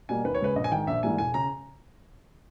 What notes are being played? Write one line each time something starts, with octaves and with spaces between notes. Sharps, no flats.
B2 G3 A#3 G#5
D#2 B4
C#5
C#3 G#3 B4
A#1 D#5
G#5
G#2 D#3 G5
A#1 E5
G#2 E3 G3 A#3 G#5
E1 G#5
C#3 A#5